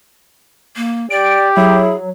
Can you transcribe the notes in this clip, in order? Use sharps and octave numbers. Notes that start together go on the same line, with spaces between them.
A#3
G4 D5 D7
F#3 E4 G#4